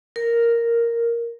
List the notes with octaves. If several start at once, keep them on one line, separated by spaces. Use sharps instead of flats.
A#4